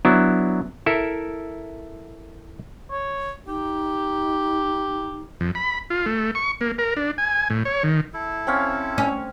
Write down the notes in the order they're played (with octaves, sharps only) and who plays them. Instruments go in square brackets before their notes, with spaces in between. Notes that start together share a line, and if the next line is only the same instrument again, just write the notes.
[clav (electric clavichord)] F#3 B3 D4 E4
E4 A4 A#4 E5
[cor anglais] C#5
[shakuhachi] D#4 [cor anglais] G4
[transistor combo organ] F2
B5
F4
A3
C#6
A#3
A#4
D4
G#5
A2
C#5
D#3
[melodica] E4 A4
[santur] C4 C#4 F5
[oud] C#4